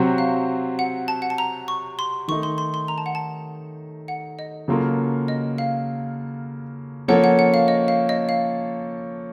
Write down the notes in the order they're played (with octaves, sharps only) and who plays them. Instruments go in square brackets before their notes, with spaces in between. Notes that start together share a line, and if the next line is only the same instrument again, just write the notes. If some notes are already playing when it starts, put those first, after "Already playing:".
Already playing: [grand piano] C3 F#3 C4 F#4
[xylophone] F5
F#5
A5
F#5
A5
A#5
C#6
C6
[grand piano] D#3 A3 D#4 [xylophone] C#6
[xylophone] C6
C6
C6
A#5
A5
F#5
A5
F#5
D#5
[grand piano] C#3 F#3 A#3 F4 A4
[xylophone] D#5
F5
[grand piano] F3 A#3 C#4 A4 C#5 [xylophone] F#5
[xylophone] F#5
F#5
F5
D#5
F5
D#5
F5